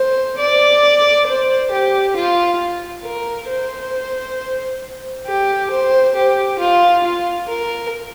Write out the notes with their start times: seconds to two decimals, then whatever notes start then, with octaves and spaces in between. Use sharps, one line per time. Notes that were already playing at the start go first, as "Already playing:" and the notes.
Already playing: C5
0.38 D5
1.27 C5
1.71 G4
2.15 F4
3.04 A#4
3.49 C5
5.26 G4
5.71 C5
6.15 G4
6.59 F4
7.04 F4
7.48 A#4